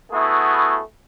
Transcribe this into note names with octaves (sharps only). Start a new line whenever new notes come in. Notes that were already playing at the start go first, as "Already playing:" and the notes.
A3 B3 E4 F#4 G#4